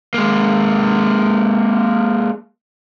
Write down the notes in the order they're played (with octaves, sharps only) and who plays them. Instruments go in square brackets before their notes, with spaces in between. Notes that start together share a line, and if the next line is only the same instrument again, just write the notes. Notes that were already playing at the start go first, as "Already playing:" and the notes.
[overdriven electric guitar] G#3 A#3